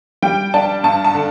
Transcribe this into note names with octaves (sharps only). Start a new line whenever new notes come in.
G3 G5
D4 A5
G2 A5
A5
D3